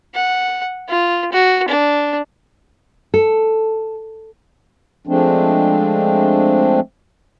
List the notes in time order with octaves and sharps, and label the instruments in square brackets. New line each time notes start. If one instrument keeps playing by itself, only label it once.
[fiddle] F#5
F4
F#4
D4
[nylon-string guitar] A4
[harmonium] F3 G#3 A3 C4 D4